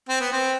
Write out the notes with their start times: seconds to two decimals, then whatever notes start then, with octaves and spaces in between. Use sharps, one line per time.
0.09 C4
0.21 B3
0.32 C4